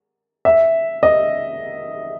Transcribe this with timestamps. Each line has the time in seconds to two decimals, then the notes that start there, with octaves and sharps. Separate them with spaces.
0.45 E5
1.03 D#5